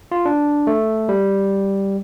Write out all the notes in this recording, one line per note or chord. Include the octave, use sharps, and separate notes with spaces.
F4
D4
A3
G3